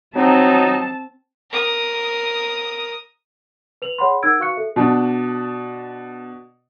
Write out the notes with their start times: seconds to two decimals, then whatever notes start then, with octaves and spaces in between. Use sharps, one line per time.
0.15 F#3 C4 D#4 A5
1.51 A#4 D#6
3.82 B4 F7 F#7
3.99 G#4 C#5 F#5 B5 C6
4.23 D#4 A#4 F#5 E6 G#6 D7
4.39 F#4 B4 F5 C#6 F#6 C#7
4.57 A4 E5
4.76 B2 D4